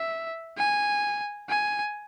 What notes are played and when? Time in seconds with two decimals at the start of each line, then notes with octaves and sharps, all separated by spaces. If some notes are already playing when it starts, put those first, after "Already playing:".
Already playing: E5
0.57 G#5
1.49 G#5